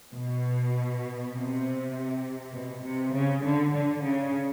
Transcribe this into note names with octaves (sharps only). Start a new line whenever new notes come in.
B2
C3
B2
C3
C#3
D3
D3
C#3